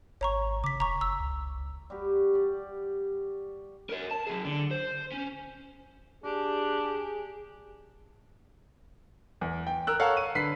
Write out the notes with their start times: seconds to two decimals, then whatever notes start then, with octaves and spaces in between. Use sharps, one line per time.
0.21 G#1 C#5 A#5 C#6
0.64 C#3 D6 B6
0.80 E1 A#5 C#6
1.01 F#1 E6
1.20 C#2
1.90 G3 F#4 G4
2.33 G4 D5
3.89 A#4 C#5
4.11 A5
4.27 F#3 G#4
4.45 D3
4.71 C5
5.12 C#4
6.24 D4 G4 G#4
9.41 E2
9.67 G5
9.87 A#4 E6 F#6
9.99 A4 C#5 F5 F#5 A5 A#5
10.17 D#7
10.35 D3 B4 B6 C7